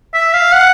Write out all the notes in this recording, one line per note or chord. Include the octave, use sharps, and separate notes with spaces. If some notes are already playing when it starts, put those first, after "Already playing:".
E5
F5
F#5